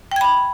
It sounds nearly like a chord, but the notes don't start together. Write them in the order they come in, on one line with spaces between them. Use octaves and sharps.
G5 G#6 B5